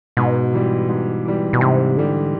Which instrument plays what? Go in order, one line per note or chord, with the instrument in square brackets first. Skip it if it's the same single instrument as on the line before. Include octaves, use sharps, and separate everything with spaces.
[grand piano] G#2 [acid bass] B2
[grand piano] E3 G3
G#2
E3 G3
[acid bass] B2
[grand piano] G#2 [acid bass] C3
[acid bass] D3 [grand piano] E3 G3